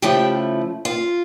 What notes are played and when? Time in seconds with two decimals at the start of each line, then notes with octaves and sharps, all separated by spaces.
0.02 C#3 F3 A3 E4 G4
0.85 F4